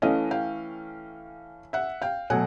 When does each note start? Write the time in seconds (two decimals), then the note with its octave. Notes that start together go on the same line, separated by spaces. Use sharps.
0.02 E3 A3 C#4 D#5 F5
0.31 F5 G5
1.73 E5 F#5
2.02 F5 G5
2.30 B2 F#3 A3 F#5 G#5